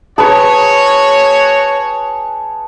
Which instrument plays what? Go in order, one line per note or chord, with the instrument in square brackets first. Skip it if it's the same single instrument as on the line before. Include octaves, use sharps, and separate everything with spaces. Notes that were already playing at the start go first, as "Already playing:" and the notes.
[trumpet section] F#4 C#5 [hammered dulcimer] G#4 B4 [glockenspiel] A5